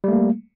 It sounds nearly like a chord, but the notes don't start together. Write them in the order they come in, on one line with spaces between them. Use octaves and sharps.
G3 A3 A#3